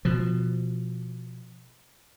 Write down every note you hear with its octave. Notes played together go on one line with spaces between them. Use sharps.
B2 F3